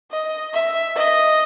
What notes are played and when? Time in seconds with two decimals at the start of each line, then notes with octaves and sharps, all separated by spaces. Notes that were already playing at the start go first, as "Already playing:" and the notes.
0.11 D#5
0.53 E5
0.96 D#5